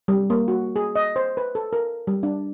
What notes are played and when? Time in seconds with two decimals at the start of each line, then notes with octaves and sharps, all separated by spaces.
0.08 G3
0.30 A#3
0.48 F#4
0.76 G#4
0.96 D#5
1.16 C5
1.37 B4
1.55 A4
1.73 A#4
2.07 G3
2.23 D4